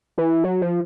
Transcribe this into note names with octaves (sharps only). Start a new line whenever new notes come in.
E3
F#3
F3